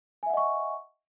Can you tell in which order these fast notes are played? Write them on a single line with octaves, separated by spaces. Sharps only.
G#5 E5 F#5 D#5 C#6